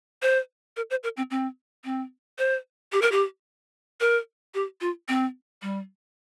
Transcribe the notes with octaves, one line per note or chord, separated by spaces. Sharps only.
C5
A#4
C5
A#4
C4
C4
C4
C5
G4
A#4
G4
A#4
G4
F4
C4
G3